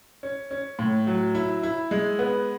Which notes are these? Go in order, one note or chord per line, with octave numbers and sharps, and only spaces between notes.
C#4
C#4
A2
F#3
E4
E4
G#3
B3